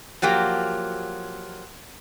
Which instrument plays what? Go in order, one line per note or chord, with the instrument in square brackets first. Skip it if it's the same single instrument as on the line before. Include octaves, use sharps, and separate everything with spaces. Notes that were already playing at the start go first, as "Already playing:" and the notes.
[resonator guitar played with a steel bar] F3 F#3 A#3 G4